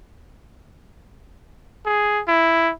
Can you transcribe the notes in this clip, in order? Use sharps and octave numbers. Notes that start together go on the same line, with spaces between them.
G#4
E4